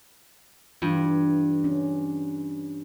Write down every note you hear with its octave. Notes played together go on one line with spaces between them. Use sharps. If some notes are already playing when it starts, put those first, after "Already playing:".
G2 E3 F4
C#4